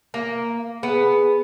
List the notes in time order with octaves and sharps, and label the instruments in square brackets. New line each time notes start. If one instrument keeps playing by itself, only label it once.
[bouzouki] A#3
[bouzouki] B3 [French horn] G#4